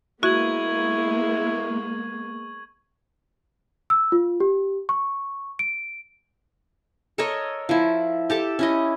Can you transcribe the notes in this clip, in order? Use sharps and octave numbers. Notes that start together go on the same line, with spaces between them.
G#3 A#3 B3 E4 F#4 C#6 G#6 F#7
E6
F4
G4
C#6
D7
A4 A#4 C#5 D#5
F3 E4
G4 A4 A5
C#4 E4 D#5